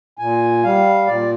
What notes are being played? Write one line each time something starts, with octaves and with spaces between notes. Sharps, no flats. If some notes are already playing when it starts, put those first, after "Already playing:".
A#2 G#5
G3 F5
A#2 D5